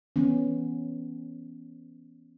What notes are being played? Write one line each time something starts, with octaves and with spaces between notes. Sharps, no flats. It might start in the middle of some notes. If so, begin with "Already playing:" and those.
E3 B3 C#4